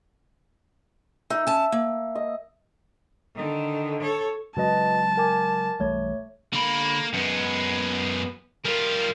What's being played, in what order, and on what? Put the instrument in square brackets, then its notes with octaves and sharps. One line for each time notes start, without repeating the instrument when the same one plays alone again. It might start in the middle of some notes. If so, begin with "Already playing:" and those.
[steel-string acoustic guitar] D#4 [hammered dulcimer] E5
[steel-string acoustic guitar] C#4 A5
A#3
[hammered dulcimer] D#5
[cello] D3 D#3
A4 C#5
[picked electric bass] C#3 F#3 G#3 [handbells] F#4 B4 D#5 [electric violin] A5
[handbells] A#4 G#5 D6
[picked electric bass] B1 E3 G3 [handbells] A3 C#5
[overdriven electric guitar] D3 B5 [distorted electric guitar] A#3
[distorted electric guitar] F#2 G#3 [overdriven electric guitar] B3
[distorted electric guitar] G3 F4 [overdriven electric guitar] A#4